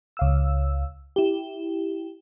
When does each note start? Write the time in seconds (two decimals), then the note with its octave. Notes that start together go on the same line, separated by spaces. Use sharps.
0.17 C#2 F5 E6
1.16 E4 G4